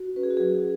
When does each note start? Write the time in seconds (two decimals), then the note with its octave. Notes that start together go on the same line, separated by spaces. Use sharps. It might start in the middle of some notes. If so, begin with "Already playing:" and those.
Already playing: F#4
0.16 C#4 B4
0.23 G#4
0.31 F#4
0.37 F#3 G#4